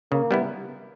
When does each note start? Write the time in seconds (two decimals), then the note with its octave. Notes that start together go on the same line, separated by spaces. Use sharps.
0.12 C#3 A#3
0.31 G3 B3 E4